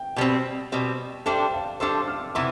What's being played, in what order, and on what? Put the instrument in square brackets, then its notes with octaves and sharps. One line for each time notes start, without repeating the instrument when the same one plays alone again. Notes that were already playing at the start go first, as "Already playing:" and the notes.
Already playing: [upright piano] G5
[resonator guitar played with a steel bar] B2 G3 C4
B2 G3 C4
[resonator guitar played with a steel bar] G3 D4 A4 C5 [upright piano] E5 G5
[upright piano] F5 A5
[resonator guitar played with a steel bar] G3 D4 A4 C5 [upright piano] C6 E6
[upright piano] D6 F6
[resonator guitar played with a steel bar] C3 E3 B3 E4 [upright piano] C6 E6